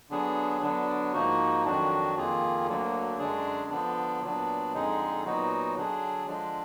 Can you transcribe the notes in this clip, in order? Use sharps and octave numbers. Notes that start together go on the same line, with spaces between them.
D3 F#3 B3 D4 G#4
D3 F#3 B3 D4
G#2 F3 A#3 D#4 F#4
F2 D#3 F#3 D4 F#4
F2 D#3 A#3 F4 G#4
D2 D3 F#3 A#3
F#2 D3 G#3 D4 G#4
D3 F3 B3 D4
A#2 F#3 B3 D4
F2 D3 G#3 D#4 G#4
A#2 F#3 B3 D#4 F#4
D3 F#3 D4 G#4
D3 F3 G#3 D4